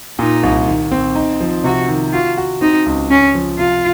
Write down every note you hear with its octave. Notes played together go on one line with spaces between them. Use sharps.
A#2 D#4
C2
D#3
C4
D#4
F3
C3 F#4
D#3
F4 F#4
F#4
C4 D#4
C#2
C#3 C#4
F3
C3 F4